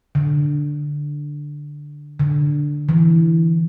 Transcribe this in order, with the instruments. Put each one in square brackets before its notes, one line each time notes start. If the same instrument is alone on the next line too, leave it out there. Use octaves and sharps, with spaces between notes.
[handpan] D3
D3
E3